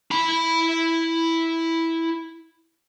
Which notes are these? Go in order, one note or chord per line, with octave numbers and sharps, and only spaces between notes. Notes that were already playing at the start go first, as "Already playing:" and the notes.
E4 B5